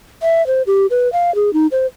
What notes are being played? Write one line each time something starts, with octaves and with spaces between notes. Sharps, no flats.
E5
C5
G4
B4
F5
G#4
D#4
C5